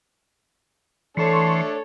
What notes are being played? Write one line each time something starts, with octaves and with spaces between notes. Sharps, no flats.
E3 A3 D4 A4 C#5 A5 C6 C#6